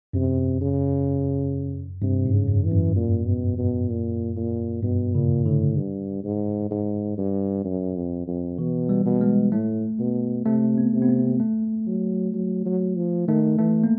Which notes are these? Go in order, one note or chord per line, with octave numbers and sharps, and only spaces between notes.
F#2 C3
C#3
G2 C3
G#2
C#3
F#2
E3
F#2
A#2
B2
B2
A#2
A#2
G2 B2
A#2 C#3
A2 D3
G2
G#2
G#2
G2
F#2
F2
F2
B2 E3
G3
B2
G#3
A2 A3
B2
C3 A3
B3
C3
B3
C4
A3
F#3
F#3
F#3
F3
D#3 A3
E3 A3
A#3